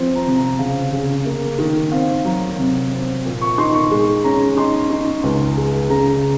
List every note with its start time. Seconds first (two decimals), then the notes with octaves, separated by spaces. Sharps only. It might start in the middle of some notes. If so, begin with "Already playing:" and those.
Already playing: F3 C4
0.15 A#5
0.27 C3
0.37 A#5
0.59 C#3 F5
0.92 C#3
1.26 A#3
1.59 D#3
1.92 C4 F5
2.25 F#3 A#5
2.58 C3
2.92 C4
3.25 A#2
3.41 C#6
3.58 D#4 C6
3.74 C#6
3.91 G#3
4.24 C#4 A#5
4.57 D#4 C6
4.90 D#4
5.23 C#2
5.57 G#3
5.90 C#3 A#5